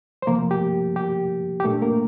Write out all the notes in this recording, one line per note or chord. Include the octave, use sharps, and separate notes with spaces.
C5
C3 F3 A3 A#3 A#4
G4
G4
G4
A#2 A3 D4 A4
A#3 A#4